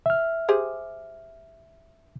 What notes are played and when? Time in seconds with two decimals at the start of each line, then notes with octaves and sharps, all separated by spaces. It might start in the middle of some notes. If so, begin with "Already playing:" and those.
0.06 E5 F6
0.48 G4 G#4 C5